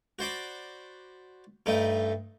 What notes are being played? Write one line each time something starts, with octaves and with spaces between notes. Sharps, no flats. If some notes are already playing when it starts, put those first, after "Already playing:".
F#4 C5 D5 B5
G2 A3 D#4